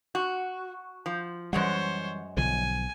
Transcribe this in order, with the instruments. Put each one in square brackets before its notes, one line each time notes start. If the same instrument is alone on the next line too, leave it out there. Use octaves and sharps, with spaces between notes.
[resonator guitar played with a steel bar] F#4
F3
[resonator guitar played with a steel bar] F#2 G#3 F#5 [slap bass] E3 G3 [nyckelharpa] C5 C#5
[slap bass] B1 D3 F3 [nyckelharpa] G#5